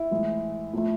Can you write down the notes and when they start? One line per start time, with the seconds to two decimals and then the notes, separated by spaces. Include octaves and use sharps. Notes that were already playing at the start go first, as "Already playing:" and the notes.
Already playing: E4
0.11 A2 E3 G#3
0.73 A2 F3 A3